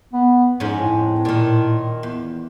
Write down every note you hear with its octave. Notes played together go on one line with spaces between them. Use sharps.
B3
F2 G#2 G#3 C#4
A2
A#2 D#3
E2